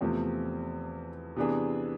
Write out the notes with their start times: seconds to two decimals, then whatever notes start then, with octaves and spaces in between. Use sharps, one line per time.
0.01 E2 C3 F3 A3 C4
1.36 C3 E3 B3 D4 G#4